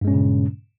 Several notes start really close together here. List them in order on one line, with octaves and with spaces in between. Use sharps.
G2 G#3 C#4 A#2 C#3